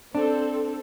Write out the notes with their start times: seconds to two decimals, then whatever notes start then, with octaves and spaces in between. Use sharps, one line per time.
0.15 C4 D4 A4